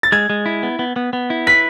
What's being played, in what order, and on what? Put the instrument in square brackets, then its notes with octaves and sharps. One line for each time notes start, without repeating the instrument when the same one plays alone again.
[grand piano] A6
[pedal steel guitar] G#3 [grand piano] G#6
[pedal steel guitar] G#3
E4
B3
B3
B3
B3
E4
[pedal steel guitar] B4 [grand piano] B6